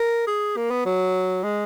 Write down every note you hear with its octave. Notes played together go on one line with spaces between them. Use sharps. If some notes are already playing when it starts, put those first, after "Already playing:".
Already playing: A#4
G#4
A#3
B3
F#3
G#3